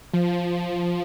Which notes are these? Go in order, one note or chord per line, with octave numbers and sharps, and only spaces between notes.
F3